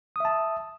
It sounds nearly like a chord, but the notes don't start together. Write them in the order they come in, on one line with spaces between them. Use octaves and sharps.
D#6 E5 A5